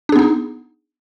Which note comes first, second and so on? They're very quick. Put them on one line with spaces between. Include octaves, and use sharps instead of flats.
D4 G#4 B3 D#4